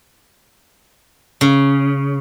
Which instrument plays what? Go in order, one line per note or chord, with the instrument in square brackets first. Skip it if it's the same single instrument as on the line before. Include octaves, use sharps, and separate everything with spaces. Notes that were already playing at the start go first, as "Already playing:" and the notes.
[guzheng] C#3